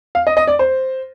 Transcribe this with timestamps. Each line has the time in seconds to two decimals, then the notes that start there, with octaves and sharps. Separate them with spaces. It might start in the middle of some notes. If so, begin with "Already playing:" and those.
0.15 F5
0.27 D#5
0.37 D#5
0.48 D5
0.59 C5